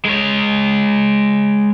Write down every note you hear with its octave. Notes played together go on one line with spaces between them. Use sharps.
G#3 C#5